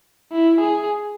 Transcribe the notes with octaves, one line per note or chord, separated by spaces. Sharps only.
E4
G#4